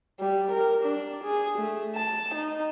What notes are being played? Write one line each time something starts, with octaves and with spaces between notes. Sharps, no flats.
G3
A#4
D4
G#4
A3
A5
D#4